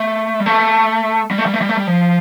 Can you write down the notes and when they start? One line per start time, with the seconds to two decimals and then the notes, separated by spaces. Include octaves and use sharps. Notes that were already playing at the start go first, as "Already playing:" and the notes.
Already playing: A3
0.40 G3
0.46 A3
1.31 G3
1.38 A3
1.46 G3
1.54 A3
1.61 G3
1.69 A3
1.77 G3
1.87 F3